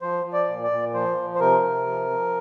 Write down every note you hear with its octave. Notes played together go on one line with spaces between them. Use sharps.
F3 C5
F3
D5
A#2
D5
A#2
F3 C5
F3
C5
C3 A#4
C3
F3
F3